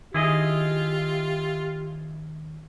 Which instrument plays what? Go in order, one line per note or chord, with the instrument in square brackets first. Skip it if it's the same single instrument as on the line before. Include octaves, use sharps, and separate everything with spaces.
[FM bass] D#3 [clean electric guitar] E4 G#4 D#5 [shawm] F4 [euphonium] G4